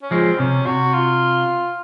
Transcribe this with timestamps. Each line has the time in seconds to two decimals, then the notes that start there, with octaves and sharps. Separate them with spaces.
0.02 C#4
0.11 F3 G#3 C4
0.39 C3 C#4
0.66 C3 F#4
0.94 F4